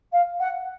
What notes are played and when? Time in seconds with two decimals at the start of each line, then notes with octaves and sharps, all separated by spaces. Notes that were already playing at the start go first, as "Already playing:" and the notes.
0.12 F5
0.39 F#5